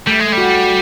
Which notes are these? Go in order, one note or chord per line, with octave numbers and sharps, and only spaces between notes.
G3 A3
G#3
G3
F#4